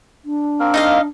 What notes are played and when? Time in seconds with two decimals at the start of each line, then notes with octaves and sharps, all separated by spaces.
0.25 D4
0.60 A#3 C4 A#4
0.74 D#4 D#5 F5